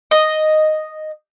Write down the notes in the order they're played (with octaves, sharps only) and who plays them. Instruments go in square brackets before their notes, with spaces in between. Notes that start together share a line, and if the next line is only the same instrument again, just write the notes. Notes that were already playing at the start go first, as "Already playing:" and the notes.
[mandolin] D#5